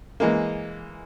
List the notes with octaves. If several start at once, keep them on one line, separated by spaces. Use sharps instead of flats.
E3 G#3 A#3